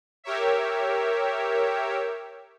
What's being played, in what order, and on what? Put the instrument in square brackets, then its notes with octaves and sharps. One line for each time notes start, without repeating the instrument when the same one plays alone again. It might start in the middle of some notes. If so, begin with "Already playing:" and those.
[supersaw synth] G4 A#4 C#5 E5